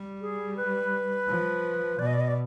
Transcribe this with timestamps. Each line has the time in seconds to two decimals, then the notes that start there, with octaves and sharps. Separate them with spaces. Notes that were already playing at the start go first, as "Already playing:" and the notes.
Already playing: G3
0.21 G#4
0.57 B4
1.28 F3
1.99 B2 D5
2.06 D#5
2.13 D5
2.20 D#5
2.28 D5